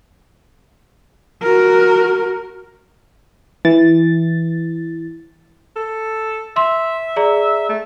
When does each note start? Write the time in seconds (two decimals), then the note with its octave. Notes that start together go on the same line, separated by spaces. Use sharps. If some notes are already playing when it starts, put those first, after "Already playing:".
1.43 F#4 A#4
3.65 E3 A6
5.76 A4
6.56 E5 C6
7.16 G#4 D5 A#5
7.69 A3